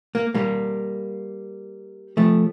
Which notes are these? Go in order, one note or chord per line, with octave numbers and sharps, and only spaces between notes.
A#3
G3 A#3
F3 A3